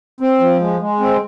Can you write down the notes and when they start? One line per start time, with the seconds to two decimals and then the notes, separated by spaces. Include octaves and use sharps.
0.20 C4
0.41 F3
0.60 G#3
0.80 G#3
1.00 C4